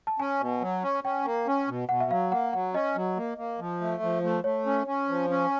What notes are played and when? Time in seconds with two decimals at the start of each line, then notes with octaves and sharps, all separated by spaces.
0.07 A5
0.19 C#4 G#5
0.41 B2
0.61 F#3
0.83 C#4
1.04 C#4 G5
1.25 A#3
1.47 C#4
1.68 B2
1.89 B2 F#5
2.00 E5
2.11 F#3 F5
2.32 A#3 F#5
2.53 F#3 F#5
2.74 C#4 D#5
2.96 F#3
3.17 A#3
3.38 A#3
3.59 F3
3.81 A3
4.02 F3
4.24 A3
4.44 A3 C#5
4.66 C#4
4.87 C#4
5.08 F3
5.30 C#4